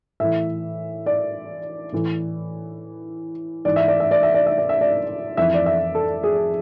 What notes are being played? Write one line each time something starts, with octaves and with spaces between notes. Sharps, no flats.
A2 E3 E5
D5
A2 E3
G#2 E3 D5
E5
D5
E5
D5
E5
D5
E5
D5
E5
D5
F2 E3 E5
D5
E5
A4
G#4